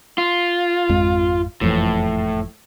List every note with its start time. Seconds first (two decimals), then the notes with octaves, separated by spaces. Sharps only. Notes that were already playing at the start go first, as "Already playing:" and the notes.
0.18 F4
0.89 G#1 F2 G#3
1.61 F#1 F2 A2 E3